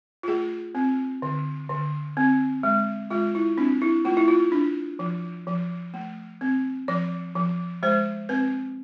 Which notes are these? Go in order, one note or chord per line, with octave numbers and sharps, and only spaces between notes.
F4
A3 G#4
C4
D3
D3
C4
G#3
G#3 F4
E4
C4 D4
E4
A3 F4
E4
F4
D4
F3
F3
A3
C4
F3 D5
F3
G#3 C5
C4 B4